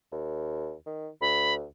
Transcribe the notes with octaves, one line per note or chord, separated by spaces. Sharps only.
D#2
D#3
D2 B5